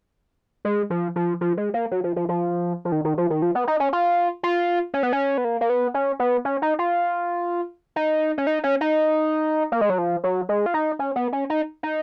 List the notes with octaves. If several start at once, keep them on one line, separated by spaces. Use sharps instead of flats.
G#3
F3
F3
F3
G#3
A#3
F#3
F3
F3
F3
F3
D#3
D#3
F3
D#3
F3
B3
D#4
C#4
F4
F4
C#4
B3
C#4
B3
A#3
A#3
B3
C#4
B3
C#4
D#4
F4
D#4
C#4
D#4
C#4
D#4
A#3
G#3
F#3
F3
F#3
G#3
F4
D#4
C#4
B3
C#4
D#4
D#4